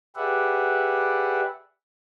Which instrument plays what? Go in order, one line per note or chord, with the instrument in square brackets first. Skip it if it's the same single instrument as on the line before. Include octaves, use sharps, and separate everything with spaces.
[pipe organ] G4 G#4 B4 D5 E5 F#5